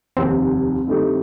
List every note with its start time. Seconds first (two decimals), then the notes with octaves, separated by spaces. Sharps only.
0.17 F1 D#2 D#3 G3 C4
0.87 G2 D#3 A3 D#4 G4